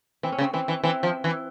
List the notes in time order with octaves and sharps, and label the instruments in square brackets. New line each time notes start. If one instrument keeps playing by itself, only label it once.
[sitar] E3 [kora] C4
[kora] C#4
[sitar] C#3
[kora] C4
[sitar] E3 [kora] C4
[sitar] E3
[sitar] E3 [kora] C4
[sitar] F3
E3